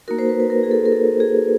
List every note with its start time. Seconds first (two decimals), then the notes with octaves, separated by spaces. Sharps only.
0.08 A#3 D#4 F#4 A#4
0.19 C5
0.29 B4
0.40 B4
0.50 A#4
0.63 G#4
0.71 A4
0.85 A#4
0.92 A4
1.20 G#4